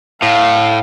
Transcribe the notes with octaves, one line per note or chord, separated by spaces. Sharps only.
A2 F5